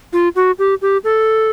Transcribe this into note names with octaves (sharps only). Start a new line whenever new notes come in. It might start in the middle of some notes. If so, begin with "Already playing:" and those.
F4
F#4
G4
G4
A4